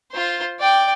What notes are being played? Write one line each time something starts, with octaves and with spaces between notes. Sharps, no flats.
F4 C5
D5 G5